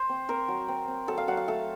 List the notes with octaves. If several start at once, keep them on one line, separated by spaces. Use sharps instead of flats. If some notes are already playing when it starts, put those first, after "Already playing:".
Already playing: C5
C4
C4 A#4
F#3
C4
C4
F#3 A4
F5
F#3 F#5
F5
A3 A4